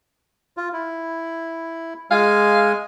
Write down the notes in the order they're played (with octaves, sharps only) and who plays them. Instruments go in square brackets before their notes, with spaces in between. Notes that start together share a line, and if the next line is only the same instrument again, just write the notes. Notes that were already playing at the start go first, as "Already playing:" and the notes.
[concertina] F4
E4
[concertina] G#3 G#5 [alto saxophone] F5